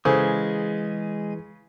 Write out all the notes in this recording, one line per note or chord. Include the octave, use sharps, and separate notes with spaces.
C#3 E3 G#3 G#4 A4 C5 D#6